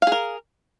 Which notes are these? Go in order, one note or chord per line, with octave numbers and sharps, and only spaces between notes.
G#4 A#4 F5